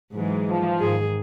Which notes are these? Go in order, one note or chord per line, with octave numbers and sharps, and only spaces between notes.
G#2 E3 F#3 G#3
F3
G#2 D#3 G#4